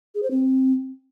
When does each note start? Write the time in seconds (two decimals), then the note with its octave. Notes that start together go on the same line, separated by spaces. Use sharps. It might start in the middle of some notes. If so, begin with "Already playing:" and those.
0.15 G#4
0.23 C5
0.31 C4